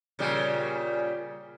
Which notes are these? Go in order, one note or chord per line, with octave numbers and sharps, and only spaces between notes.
A#2 C#3 G3